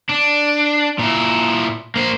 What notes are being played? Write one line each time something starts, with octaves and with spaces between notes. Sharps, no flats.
D4
A#2 E4
A#3 C5